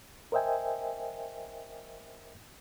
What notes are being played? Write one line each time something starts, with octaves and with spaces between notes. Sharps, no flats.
A#4 C5 D#5 E5 G5 G#5